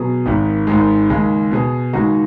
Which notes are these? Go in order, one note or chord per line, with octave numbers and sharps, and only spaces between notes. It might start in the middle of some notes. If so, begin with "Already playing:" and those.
Already playing: B2 F#3 B3 G#4
G#1 G#2 D#3
G#1 G#2 G#3
D#2 C#3 G#3
B2 B3 G#4
D#2 C#3 G#3 D#4 F#4